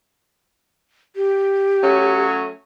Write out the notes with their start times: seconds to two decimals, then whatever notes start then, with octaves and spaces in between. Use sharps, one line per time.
1.16 G4
1.83 F#3 A3 C#4